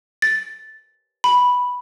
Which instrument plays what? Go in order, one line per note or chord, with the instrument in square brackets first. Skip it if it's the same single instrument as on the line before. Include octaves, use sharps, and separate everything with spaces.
[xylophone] A6
B5